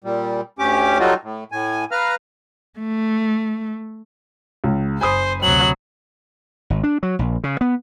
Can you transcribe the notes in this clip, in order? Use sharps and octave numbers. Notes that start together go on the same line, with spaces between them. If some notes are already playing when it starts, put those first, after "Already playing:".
A#2 G3
D2 C#4 G4 D6
F#3 G3 A3 D#4 F4 F#4
A2
A2 G#5
B4 F5 A#5 F6
A3
C#2
F#1 C5 G#5 B5 D#6
D2 C3 F#3 F#7
G#1
D4
F#3
A#1
C#3
B3